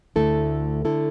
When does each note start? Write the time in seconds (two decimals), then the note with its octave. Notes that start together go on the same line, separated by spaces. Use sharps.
0.16 D2 D3 A3 E4 A4
0.85 D3 A3 E4 A4